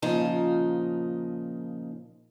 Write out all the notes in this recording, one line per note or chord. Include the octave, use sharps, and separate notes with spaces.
A#2 C#3 F3 D#4 A5